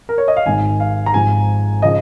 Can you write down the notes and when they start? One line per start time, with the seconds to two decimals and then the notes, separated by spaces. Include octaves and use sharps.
0.09 A#4
0.18 C#5
0.28 D#5
0.37 F5
0.46 G#1 G#2 D#3 G#5
0.80 F5
1.06 A#5
1.14 G#1 G#2 F3 G#5
1.82 C#3 F3 D#5